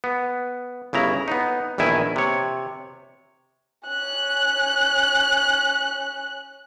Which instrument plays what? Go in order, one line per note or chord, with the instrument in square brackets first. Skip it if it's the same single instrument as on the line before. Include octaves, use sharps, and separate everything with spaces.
[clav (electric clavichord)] B3
G1 C#3 E4 A#5
B3 D#4
A#1 E2 D#3 E4 G#5
C3 C#5
[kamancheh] C#4 F#6